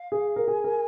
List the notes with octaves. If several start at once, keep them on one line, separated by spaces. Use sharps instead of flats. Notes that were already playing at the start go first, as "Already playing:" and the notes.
Already playing: F5
G#4
A#4
G#4 G#5
A#4